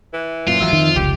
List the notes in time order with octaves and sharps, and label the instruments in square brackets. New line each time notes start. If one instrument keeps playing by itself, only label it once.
[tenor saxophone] E3
[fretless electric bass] F#2 A#2 [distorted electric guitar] F4
[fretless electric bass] G#1 E3 F#3 [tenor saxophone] E5
[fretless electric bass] F2 [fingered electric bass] D#3
[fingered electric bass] F1 C#2 [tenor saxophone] G4